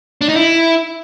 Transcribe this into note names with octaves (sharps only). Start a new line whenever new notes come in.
D4
D#4
E4